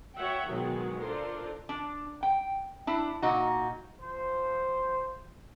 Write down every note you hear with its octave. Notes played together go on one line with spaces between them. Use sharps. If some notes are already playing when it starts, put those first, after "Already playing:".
F#4 C#5 E5 F#5 G5
B2 D#3 F#3 G#3
D4 F4 A4 A#4 C5
D4
G5
D4 E4
A#2 D#4 F#4
F3 C5